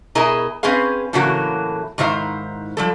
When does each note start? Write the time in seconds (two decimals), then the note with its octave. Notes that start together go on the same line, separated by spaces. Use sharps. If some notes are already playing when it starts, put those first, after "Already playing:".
0.15 B2 E4 G#4 A#4 D#5 A#5
0.63 C4 C#4 G#4 B4 F5
1.13 A2 C#3 E3 F#3 A#3 F#4
1.98 G#2 D#3 E4 C5 F5
2.77 F3 G3 A4